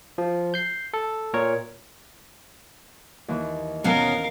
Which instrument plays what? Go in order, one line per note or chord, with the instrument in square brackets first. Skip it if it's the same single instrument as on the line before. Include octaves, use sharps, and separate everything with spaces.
[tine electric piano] F3
G6 C7
A4
A#2 A#4 C#5
[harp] D#2 E3
[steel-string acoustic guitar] B2 B3 C#4 [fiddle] A#4 F5